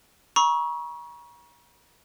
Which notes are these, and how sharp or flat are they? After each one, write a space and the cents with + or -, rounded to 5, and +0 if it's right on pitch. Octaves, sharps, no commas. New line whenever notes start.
A#5 +45 C#6 +0 E6 -30